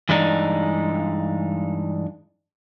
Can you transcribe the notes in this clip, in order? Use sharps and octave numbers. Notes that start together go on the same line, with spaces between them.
G2 E3 G#3 D4 D#4